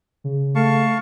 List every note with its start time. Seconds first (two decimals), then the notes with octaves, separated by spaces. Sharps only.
0.24 C#3
0.55 A3 F5 A5 C#6